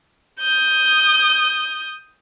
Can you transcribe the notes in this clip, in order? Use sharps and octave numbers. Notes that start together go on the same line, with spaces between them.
D#6 G6